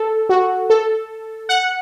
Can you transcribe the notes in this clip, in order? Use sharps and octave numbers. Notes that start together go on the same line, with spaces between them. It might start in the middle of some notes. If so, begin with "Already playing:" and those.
Already playing: A4
F#4
A4
F#5